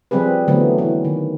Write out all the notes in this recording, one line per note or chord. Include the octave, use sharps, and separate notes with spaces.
F3 G3 C4 G#4 B4
D3 E3 F#3 A3 B3
E3
D#3